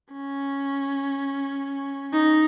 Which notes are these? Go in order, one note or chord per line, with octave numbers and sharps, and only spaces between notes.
C#4
D#4